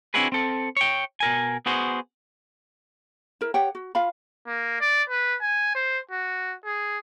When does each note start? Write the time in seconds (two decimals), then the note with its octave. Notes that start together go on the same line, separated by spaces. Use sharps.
0.14 C4 D4 E4 F#4 G#4 B4
0.32 C4 A4
0.77 C#5 G5
1.20 B2 A#4 G#5
1.66 B3 F#4 G#4 C5
3.41 E4 A#4
3.54 G4 C#5 F#5 G5
3.75 F#4
3.95 F4 F5 B5
4.47 A#3
4.80 D5
5.10 B4
5.41 G#5
5.75 C5
6.11 F#4
6.65 G#4